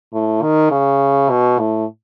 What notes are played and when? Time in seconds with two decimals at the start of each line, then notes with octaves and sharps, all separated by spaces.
0.13 A2
0.42 D#3
0.71 C#3
1.30 B2
1.59 A2